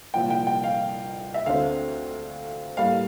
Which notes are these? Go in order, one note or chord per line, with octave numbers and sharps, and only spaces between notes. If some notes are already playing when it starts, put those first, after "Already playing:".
C2 A#2 F3 A#3 G5
G5
G5
F5
E5
D2 D3 A3 C4 F5
A2 G3 A#3 F5